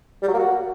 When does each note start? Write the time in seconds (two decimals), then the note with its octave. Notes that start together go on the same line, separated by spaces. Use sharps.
0.23 G3
0.28 F#3
0.34 A#3
0.39 F#4